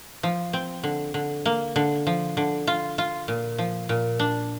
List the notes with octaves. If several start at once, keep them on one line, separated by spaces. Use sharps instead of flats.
F3
C4
D3
D3
A#3
D3
F3
D3
F4
F4
A#2
F3
A#2
D4